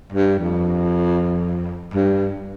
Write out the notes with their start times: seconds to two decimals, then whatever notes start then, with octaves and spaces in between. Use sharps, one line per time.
0.12 G2
0.39 F2
1.94 G2